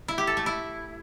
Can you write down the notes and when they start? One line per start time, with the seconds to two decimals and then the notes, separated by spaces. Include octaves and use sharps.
0.08 E4
0.18 G4
0.27 A4
0.37 A3
0.46 E4